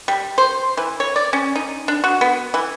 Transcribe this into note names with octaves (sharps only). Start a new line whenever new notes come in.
G3
C5
E3
C#5
D5
C#4
D#4
D4
F#4
B3
E3